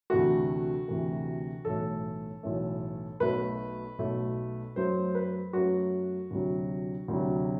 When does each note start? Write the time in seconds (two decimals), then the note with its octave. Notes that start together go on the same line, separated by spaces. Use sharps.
0.10 D2 C3 E3 A3 F#4
0.88 D2 C3 E3 A3
1.65 B1 A2 E3 A3 A4
2.43 B1 A2 E3 A3
3.20 B1 B2 A3 B4
3.98 B1 B2 A3
4.76 F#2 F#3 A3 C5
5.15 B4
5.53 F#2 F#3 A3 F#4
6.31 D2 C3 F#3
7.08 D2 C3 F#3